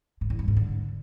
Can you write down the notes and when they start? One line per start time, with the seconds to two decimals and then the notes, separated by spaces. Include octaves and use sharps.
0.21 G#2
0.30 E2
0.39 G2
0.48 G#2
0.57 D3